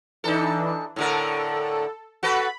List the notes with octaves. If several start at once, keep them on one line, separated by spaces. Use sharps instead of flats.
E3 D4 D#4 A4
A2 D3 A4 A#4
F#4 A4 B4 B5